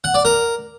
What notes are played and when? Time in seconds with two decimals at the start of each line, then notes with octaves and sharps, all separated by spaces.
0.04 F#5
0.14 D5
0.25 A#4